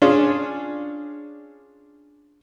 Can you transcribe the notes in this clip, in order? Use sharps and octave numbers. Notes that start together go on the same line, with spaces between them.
C#4 D4 F4 G#4